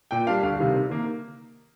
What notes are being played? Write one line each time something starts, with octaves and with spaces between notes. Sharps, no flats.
A#2 G5
G3 D4 F5
D2 F5
C3 D#3 G3
C3
D#3 A#3